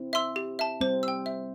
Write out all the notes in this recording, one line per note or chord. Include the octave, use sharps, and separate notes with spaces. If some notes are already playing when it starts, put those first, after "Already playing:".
Already playing: C4 E4
E5 C6 E6
G4
E5 A5
G3 C4 C5
G5 E6
E5